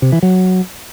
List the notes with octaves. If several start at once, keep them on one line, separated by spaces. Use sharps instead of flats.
C3
E3
F#3